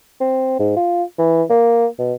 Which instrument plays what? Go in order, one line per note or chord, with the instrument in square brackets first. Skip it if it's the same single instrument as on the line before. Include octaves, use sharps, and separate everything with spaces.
[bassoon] C4
G#2
F4
E3
A#3
B2